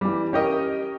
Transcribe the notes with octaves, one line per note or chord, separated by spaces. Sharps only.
E3 G3
C#4 G4 A#4 D#5